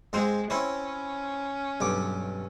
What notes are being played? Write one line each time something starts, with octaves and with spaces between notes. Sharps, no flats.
G#2 G#3 C4 C5
C4 C#4 E4 C#5
B1 G2 D6